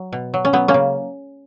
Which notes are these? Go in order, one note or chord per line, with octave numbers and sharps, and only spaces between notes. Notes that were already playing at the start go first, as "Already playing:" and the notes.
Already playing: F#3
B2
F#3
C#4
F#3 B3
A#3 C#4
C#3